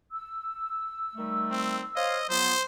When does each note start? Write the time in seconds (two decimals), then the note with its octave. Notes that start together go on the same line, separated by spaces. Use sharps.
0.11 E6
1.16 D#3 G3 A3
1.51 C4
1.96 C5 C#5 D#5 F5
2.29 F3 F#3 B3 C5